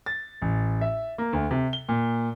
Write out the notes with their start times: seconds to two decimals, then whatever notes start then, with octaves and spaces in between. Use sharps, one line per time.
0.06 A6
0.42 A1
0.81 E5
1.18 A#3
1.33 D2
1.51 C3
1.73 G7
1.89 A#2